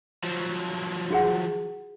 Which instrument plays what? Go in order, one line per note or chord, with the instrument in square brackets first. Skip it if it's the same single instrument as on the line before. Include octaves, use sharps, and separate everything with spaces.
[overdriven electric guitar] F3 F#3
[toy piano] F#4 G#4 F#5